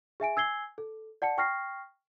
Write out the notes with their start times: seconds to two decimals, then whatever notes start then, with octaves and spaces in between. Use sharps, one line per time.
0.20 G#4 E5 G#5 D7
0.36 G#5 E6 G#6 C7 G7
0.78 A4
1.22 D5 F#5 A5 C#7
1.38 G5 C#6 F6 A#6 C7